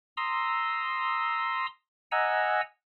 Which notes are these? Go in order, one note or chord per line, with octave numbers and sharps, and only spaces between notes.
A#5 C6 D#6 E6
D#5 F#5 G#5 A#5 E6